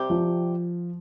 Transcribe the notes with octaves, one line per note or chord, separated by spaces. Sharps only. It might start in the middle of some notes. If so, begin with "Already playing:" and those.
Already playing: C3 G3 C4 G4
F3